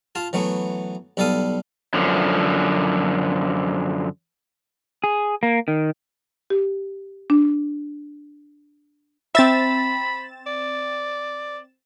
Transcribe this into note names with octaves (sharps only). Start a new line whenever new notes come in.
F4 F5 A5
E3 F#3 A3 B3
B1 G3 A4 D5 F5 D#6
F#2 D3 F3
G#4
A#3
D#3
G4
D4
C4 E5 B5 A6 E7
D5